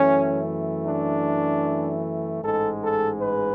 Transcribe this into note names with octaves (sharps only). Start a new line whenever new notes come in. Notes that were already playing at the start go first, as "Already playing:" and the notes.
Already playing: F#2 E3 A3 C#4
D4
A1 G#2 G#3 A4
A4
B4